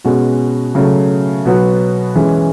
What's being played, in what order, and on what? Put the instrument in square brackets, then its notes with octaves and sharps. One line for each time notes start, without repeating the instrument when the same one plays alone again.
[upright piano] B2 G#3 C#4 F#4
C#3 F#3 A3
B2 F#3 B3 F#4 B4
E3 G#3 C#4